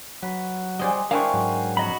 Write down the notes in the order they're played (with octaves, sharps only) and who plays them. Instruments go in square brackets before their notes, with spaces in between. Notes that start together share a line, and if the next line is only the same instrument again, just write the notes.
[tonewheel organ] F#3 [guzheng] B4
[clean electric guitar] G3 C5 D5 [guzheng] G#4 D#5
[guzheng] D4 E4 [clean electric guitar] A#4 C5 G5 [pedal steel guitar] F5 G#5 C#6
[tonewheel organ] G#2 F#3
[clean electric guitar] F2 A#5 [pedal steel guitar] F#4 D#5 B5